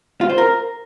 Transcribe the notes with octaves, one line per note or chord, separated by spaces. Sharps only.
F4
C5
A#4